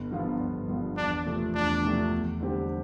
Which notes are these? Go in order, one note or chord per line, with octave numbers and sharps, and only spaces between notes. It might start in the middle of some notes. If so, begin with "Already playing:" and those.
Already playing: G1
G2 F3 B3 F4
G1
G2 F3 B3 F4
E2 D4
C3 F3 A3
E2 D4
C3 F3 A3
E2
D3 G3 C4 G4